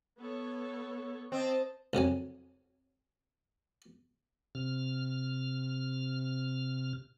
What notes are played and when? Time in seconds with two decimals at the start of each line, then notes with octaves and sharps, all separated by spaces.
0.19 B3 A4 C#5
1.32 C4 D#5 A5
1.93 C2 F2 F#3 G#5
4.55 C3 F6